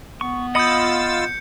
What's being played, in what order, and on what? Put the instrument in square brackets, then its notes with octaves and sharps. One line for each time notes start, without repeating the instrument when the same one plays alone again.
[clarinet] B3 [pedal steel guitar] C#6
[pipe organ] F4 E6 A6 [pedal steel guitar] D#5 B5 D#6 [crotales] G6 C#7